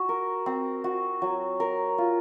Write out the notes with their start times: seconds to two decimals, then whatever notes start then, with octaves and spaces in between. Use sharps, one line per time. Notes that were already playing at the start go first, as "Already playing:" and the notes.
Already playing: F#4
0.09 A#4
0.46 C4
0.84 F#4
1.22 F#3
1.60 A#4
1.98 F4